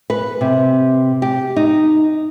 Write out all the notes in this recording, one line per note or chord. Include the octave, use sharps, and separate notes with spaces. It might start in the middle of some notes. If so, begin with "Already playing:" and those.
B4
C3
G4
D#4